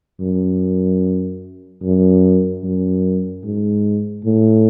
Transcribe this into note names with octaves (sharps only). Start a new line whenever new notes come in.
F#2
F#2
F#2
G#2
A2